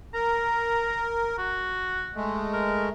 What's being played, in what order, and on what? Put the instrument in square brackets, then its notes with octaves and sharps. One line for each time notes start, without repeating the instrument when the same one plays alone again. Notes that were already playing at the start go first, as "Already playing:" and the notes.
[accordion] A#4 [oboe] A#5
[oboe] F#4
[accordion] G#3 A3
[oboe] A#4